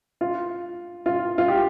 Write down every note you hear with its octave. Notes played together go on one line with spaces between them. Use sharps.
F4
F4
F4
G4